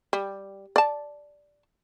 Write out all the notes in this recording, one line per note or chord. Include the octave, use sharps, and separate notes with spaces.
G3
D5 A5